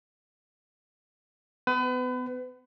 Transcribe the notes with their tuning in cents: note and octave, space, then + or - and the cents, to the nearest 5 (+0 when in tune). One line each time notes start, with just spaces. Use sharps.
B3 +30 B4 +35